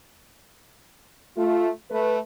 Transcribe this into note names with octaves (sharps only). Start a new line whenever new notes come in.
A3 F4
A3 B4